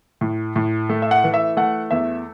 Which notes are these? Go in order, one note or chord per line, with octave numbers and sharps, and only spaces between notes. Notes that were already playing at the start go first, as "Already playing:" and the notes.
A2
A2
A3
E5
F#5
E3
E5
A3 F#5
E2 E5